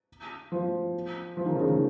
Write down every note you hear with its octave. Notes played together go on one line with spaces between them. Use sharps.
F3
F3
D#3
C#3
D#3